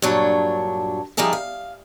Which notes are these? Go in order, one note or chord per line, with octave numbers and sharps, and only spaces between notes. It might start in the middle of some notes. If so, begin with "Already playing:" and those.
G2 A#2 F#3 D4 C#5
F3 G3 D#4 G4 G#4 E5
F5